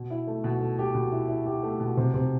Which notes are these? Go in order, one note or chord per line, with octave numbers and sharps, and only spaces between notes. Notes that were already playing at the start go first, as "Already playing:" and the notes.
Already playing: B2
E4
A3
B2
A3
G4
B2
E4
E4
G4
A3
B2
C3
C3